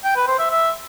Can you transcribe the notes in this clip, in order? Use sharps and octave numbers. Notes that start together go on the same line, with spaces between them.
G5
B4
C5
E5
E5